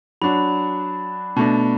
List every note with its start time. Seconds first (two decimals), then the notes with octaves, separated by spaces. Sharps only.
0.22 F#3 D4 F#4 B5
1.36 B2 A3 D4 A5